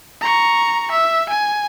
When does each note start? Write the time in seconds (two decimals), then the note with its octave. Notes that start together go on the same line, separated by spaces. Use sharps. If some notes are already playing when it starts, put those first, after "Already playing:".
0.21 A#5 C#6
0.91 E5
1.29 G#5